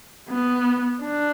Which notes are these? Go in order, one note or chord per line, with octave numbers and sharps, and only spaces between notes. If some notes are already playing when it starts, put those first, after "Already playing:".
B3
D4